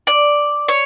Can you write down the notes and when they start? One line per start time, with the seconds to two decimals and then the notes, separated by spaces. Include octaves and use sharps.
0.07 D5
0.68 C#5